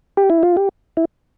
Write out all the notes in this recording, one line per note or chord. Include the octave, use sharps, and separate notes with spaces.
G4
E4
F4
G4
E4